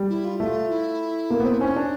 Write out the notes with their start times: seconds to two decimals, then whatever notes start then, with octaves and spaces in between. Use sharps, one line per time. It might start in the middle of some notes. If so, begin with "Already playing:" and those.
Already playing: G3
0.09 E4
0.25 F4
0.40 A3 F4
0.69 E4
1.30 A#3
1.40 B3
1.46 C4
1.60 C#4 D#4
1.76 D4